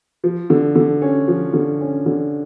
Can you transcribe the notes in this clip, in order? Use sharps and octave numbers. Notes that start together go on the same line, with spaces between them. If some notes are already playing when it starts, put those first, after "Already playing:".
F3
D3
D3
C#4
F3
D3
C#4
D3